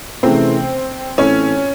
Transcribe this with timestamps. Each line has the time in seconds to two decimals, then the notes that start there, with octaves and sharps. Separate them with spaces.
0.23 C3 E3 A3 C4 C#4 G#4
1.18 A2 E3 C4 C#4 E4 A4